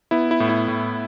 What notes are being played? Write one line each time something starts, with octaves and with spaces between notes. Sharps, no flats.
B3 E4
E4
A2
E4
A2